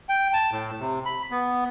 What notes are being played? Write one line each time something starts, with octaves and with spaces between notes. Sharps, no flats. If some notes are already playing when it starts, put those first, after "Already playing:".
G5
A5
A2
C3
B5
B3